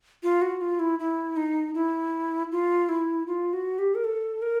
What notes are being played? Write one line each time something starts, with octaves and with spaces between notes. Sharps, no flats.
F4
F#4
F4
E4
E4
D#4
E4
F4
E4
F4
F#4
G4
A#4
A4
A#4